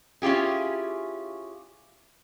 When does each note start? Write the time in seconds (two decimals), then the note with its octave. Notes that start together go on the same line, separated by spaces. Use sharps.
0.22 C#4 E4 F4 G4 G#4